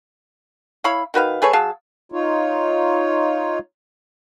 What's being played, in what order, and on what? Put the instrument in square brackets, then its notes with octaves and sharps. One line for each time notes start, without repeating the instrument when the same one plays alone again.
[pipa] E4 C#5 F5 B5
D#3 F#4 B4 F5
A3 G#4 B4 C#5
F#3 G#4 F5 A5
[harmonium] D#4 F4 C#5